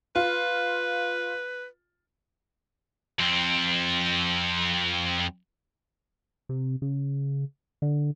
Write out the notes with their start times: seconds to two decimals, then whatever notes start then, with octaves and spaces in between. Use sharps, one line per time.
0.16 F4 B4
3.19 F2 C4
6.49 C3
6.82 C#3
7.82 D3